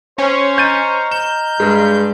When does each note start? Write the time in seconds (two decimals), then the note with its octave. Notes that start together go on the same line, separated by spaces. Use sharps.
0.18 C#4 C5 C#5
0.58 D#5 A#5 F6 G6 A6 D#7
1.11 G6 E7
1.60 G2 G#3